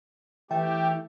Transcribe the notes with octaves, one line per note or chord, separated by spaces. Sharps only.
E3 A3 G4 G5